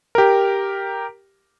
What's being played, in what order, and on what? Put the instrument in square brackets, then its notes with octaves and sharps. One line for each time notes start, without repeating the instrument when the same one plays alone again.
[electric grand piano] G4 A#4